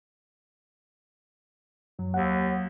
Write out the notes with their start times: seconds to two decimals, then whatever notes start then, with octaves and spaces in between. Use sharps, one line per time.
1.99 F#2 F#3
2.14 D#2 F#5